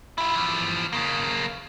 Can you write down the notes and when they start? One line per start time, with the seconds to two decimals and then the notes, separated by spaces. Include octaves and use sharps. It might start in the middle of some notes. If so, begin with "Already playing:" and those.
0.18 E4 F4
0.36 E3 F3
0.92 C#3 A#3